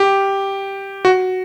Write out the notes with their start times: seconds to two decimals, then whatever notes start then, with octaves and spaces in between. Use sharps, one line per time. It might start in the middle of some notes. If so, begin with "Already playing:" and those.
Already playing: G4
1.05 F#4